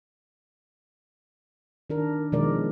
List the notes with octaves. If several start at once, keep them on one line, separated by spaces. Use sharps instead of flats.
D#3 D4 A#4
B2 D#3 F3 G#3 A#4 D5